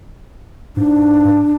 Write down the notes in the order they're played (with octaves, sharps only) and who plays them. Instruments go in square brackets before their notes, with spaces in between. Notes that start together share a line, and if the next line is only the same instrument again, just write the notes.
[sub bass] G#2 [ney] D4